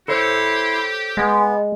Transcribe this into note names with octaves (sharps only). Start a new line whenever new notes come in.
E4 G4 A4 C5 C#5 C6
G#3 B3